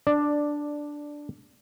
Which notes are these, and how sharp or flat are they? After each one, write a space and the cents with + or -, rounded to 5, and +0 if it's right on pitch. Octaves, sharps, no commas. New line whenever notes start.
D4 +0 D5 +10